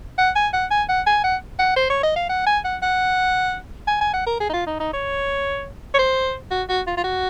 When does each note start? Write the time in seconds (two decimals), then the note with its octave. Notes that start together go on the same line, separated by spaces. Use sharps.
0.18 F#5
0.36 G#5
0.53 F#5
0.71 G#5
0.89 F#5
1.06 G#5
1.24 F#5
1.59 F#5
1.76 C5
1.90 C#5
2.03 D#5
2.16 F5
2.29 F#5
2.46 G#5
2.64 F#5
2.82 F#5
3.87 G#5
4.01 G#5
4.14 F#5
4.27 A#4
4.40 G#4
4.49 D#4
4.53 F4
4.67 D#4
4.80 D#4
4.93 C#5
5.94 C#5
5.99 C5
6.51 F#4
6.69 F#4
6.87 F4
6.97 F4
7.04 F#4